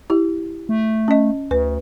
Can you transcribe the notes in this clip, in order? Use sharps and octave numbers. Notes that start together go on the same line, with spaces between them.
E4 G4
A3
C#4 D#5
D2 B4